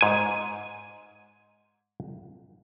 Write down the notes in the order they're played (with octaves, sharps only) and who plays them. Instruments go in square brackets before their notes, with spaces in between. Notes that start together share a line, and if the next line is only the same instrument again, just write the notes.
[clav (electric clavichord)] G#2 G#5